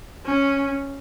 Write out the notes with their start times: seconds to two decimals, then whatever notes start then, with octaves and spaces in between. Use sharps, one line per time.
0.26 C#4